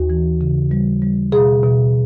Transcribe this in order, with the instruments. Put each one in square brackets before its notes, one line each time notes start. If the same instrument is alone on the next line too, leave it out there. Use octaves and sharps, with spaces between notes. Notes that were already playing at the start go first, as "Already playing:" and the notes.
Already playing: [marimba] D#2 F#4
E3
C#3
G3
G3
B2 G#4
B2